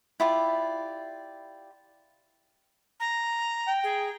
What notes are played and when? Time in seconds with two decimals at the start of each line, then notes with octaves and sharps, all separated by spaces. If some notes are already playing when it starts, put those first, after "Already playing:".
0.20 E4 F4 G4 D5
3.00 A#5
3.68 G5
3.83 G#4